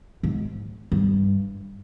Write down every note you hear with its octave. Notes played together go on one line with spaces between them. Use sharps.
G#2
G2